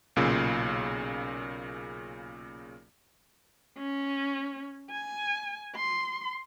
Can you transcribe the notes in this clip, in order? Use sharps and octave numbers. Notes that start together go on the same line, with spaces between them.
B1 A#2 C#3
C#4
G#5
C6